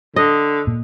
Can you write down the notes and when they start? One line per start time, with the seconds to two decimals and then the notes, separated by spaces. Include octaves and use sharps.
0.16 D3 D#5
0.67 A#2